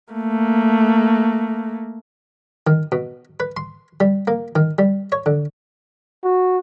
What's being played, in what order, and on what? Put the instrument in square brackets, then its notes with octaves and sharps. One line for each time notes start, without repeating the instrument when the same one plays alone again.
[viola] A3 A#3
[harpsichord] D#3
B2
B4
C6
G3
A#3
D#3
G3
C#5
D3
[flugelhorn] F#4